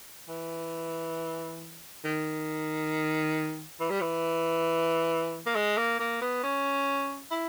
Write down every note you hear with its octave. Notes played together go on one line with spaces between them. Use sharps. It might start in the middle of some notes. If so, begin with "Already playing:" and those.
E3
D#3
E3
G3
E3
A#3
G#3
A#3
A#3
B3
C#4
E4